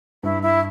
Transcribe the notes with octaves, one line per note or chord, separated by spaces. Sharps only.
G2 E4
E4